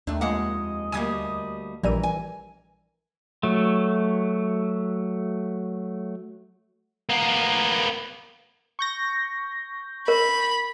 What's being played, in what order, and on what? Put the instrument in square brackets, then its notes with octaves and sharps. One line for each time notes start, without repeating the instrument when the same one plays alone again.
[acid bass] D#2 [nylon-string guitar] A3 D4
[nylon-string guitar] F2 G#3 F#5 [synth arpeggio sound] A#3 [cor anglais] D#5
[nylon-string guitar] D2 G3 A#3 [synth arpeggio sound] G#5 D#6 G#6
[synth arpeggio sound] A#1 G3 D#7 [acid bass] E3 [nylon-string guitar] A#4
[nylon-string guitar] G#5
[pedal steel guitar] F#3 A3
[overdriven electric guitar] A#3 B3
[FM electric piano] C#6 G6 A#6
[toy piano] A#4 [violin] B5